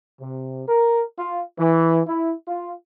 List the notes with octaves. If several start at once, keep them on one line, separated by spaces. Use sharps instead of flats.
C3
A#4
F4
E3
E4
F4